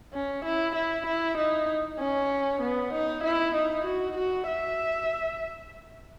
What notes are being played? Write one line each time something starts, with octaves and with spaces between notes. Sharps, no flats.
C#4
E4
E4
E4
D#4
C#4
B3
D#4
E4
D#4
F#4
F#4
E5